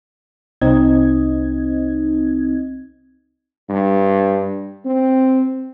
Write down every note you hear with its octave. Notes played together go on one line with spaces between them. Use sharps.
C2 C4 D#4 D#5 G#6
G2
C4